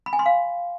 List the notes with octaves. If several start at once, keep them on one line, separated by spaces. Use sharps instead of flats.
B5
G#5
C6
F5